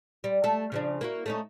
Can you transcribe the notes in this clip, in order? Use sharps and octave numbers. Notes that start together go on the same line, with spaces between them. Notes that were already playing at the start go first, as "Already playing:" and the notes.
G3
A3 A4
C#3 F3 D4
A#3 E4 F#4
A3 C#4 D#4